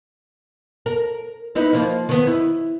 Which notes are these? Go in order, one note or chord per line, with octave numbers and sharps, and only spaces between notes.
A#4
B3 D#4 E4
F3 A#3
D#3 B3
E4